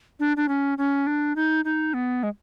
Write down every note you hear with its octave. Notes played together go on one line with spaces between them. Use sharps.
D4
D4
C#4
C#4
D4
D#4
D#4
B3
G#3